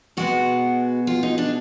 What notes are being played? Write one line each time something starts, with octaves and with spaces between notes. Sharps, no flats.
B2 G#3 B3 F#4
F4
D#4
D4